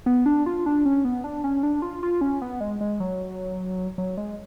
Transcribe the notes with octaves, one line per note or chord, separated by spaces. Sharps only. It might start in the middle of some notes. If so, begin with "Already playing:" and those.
B3
D4
F4
D4
C#4
B3
D4
C#4
D4
F4
F4
C#4
B3
G#3
G#3
F#3
F#3
G#3